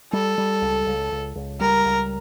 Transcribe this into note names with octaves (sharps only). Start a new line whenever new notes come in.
G3 A4
G3
C#2
C#2
C#2
C#2
G3 A#4
C#2